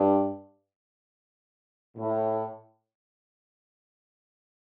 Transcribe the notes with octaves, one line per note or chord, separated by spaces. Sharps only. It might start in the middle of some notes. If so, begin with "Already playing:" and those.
Already playing: G2
A2